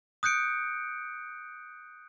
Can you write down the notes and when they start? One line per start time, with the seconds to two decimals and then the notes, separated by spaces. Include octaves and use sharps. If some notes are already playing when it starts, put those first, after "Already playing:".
0.23 D#6 F#6 G6 C#7 D7